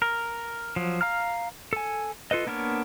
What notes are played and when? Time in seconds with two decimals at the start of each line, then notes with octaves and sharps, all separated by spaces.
0.02 A#4
0.76 F3 F#3
1.01 F5 A#5 F6
1.73 A4 G#5
2.31 F4 A4 B4 D#5
2.47 A#3 B3 D4 A#4 C#5